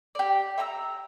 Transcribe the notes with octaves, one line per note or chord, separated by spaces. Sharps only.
G4 D5
E5 G5 A#5 E6